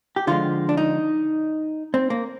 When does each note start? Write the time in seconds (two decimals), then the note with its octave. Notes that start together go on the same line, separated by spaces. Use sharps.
0.16 G4
0.27 D3 F3 G#3 F4
0.69 D4
0.77 D#4
1.94 C4
2.10 A#3